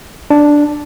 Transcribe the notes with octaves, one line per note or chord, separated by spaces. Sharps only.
D4